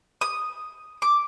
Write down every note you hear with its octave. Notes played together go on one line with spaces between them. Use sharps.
D#6
D6